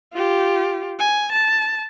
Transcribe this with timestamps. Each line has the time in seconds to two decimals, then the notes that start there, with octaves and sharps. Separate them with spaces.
0.14 F4 G4
0.99 G#5
1.32 A5